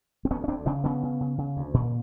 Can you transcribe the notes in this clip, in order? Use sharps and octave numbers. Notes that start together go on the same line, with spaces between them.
C4
D2 B3 C#4
C#4
D2 C4 D4
C#3 C4 D4
C#3 B3 C#4
C#3
C#3
C#3
D2
A#2